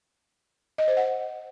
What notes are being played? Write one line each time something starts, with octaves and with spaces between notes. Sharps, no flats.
D#5
C5
F#5